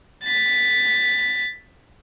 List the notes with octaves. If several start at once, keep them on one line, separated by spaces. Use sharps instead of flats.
A6 B6